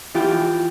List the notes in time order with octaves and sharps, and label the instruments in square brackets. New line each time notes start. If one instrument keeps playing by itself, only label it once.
[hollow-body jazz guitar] E3 F4 G4